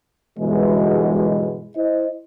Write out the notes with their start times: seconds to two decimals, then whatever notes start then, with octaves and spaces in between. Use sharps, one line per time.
0.39 G1 F#2 B2 E3 G#3
1.77 E4 C5 D#5